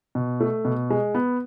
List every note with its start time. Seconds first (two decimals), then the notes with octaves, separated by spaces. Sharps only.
0.15 B2
0.40 A3
0.65 B2
0.90 G#3
1.15 B3